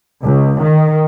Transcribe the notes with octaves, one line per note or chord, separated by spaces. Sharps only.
C#2
D#3